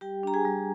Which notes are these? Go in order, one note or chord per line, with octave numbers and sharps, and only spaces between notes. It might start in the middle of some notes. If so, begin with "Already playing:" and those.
G3 G4 G5
D4 A#5
G#4 G#5
G3